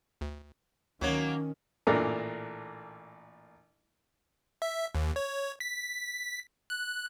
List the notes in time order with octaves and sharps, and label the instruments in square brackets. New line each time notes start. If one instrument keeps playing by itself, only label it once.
[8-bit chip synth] D2
[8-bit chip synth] D2 C#5 [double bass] D#3 [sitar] F#3 A#3 [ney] C#4
[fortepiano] A1 A#2 D4 A4 A#4
[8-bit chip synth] E5
D#2
C#5
B6
F#6